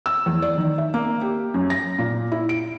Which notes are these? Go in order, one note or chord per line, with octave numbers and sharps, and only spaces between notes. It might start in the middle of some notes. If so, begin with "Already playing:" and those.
E6
E2
D5
D#3
E5
A#3
G4
F#2
A#6
A#2
E4
D7